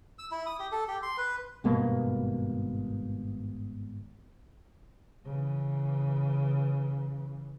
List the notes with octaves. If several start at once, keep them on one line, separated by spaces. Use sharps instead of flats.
E6
E4
D#6
G4
A4
G4
C6
B4
G#1 G2 B2 A#3
C#3 E3